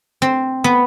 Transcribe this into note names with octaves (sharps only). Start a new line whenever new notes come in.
C4
B3